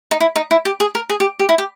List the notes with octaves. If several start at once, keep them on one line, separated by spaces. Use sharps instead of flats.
D#4
E4
D#4
E4
G4
G#4
A#4
G#4
G4
G4
E4
G4